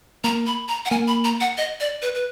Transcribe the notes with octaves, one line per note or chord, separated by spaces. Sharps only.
A#3 A#5
B5
A#5
F#5
A#3 G#5
B5
A#5
F#5
D#5
D5
B4
B4